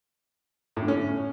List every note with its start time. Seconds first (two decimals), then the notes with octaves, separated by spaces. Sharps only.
0.77 A2
0.82 D3
0.88 C#4